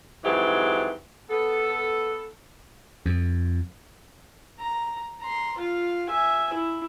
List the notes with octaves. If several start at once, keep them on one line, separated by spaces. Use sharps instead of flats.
F2 G#2 E3 F#3 G4
B3 A4
F2
A#5
A#5 C6
F4 F5
E5 G#5
E4